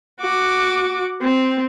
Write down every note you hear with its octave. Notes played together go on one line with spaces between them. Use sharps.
F#4 D6
C4